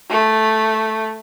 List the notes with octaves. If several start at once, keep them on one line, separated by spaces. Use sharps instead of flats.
A3